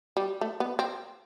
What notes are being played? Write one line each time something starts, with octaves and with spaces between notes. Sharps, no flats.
G3
A3
B3
C4